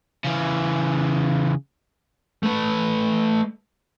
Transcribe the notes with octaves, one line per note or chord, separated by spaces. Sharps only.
C#3 E3
A3 B4